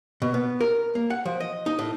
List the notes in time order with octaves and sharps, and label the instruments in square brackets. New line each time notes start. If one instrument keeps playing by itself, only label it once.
[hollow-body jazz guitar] B2
B3
A#4
A#3
F#5
F3
D#5
D#4
A2